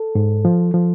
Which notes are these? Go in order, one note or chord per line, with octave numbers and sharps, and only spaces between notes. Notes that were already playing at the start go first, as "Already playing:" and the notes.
Already playing: A4
G#2
F3
F3